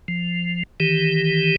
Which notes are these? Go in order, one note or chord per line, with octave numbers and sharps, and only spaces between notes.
F3
D#3 E3 G4